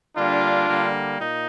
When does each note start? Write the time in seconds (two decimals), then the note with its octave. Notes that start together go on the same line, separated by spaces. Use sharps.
0.15 D3 G3 A#3 D4 F4
0.68 D3 G3 A#3
1.19 A#2 D#4